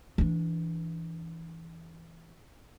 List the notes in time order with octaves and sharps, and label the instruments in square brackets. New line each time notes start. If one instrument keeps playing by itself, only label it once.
[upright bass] E3 D4